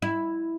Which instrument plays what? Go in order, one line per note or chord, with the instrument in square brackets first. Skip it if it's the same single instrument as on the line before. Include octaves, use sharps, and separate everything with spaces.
[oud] E4